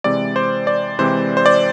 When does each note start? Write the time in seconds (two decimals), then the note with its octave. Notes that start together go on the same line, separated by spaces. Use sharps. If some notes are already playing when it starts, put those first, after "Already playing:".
0.04 C3 E3 G#3 C4 D5
0.36 C5
0.67 D5
0.99 C3 E3 G#3 C4 C5
1.37 C5
1.46 D5